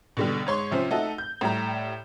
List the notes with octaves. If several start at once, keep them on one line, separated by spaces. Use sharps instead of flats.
B2 D3 G3
G#2 C#5 C6 C#6
C3 F3 C#4 C5
A3 D#4 F#4 A4
G6
A2 G3 A#5